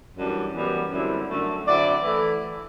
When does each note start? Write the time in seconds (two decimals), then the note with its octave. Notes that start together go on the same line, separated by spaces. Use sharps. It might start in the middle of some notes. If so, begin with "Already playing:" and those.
0.17 F#2 E3 G3 D4
0.54 F#2 E3 G3 B3
0.91 F#2 D3 G3 C4 E4
1.28 F#2 D3 A3
1.66 D3 F#3 C4 E4 D5
2.03 E3 A3 E4